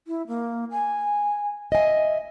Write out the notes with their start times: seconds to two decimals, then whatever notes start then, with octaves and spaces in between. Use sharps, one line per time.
0.07 E4
0.27 A#3
0.71 G#5
1.72 D#5 E5 G#5